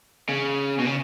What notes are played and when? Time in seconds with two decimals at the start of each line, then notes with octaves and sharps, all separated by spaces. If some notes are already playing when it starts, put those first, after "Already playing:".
0.29 C#3
0.79 B2
0.86 C#3